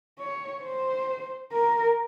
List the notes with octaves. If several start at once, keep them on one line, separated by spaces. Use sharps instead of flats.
C#5
C5
A#4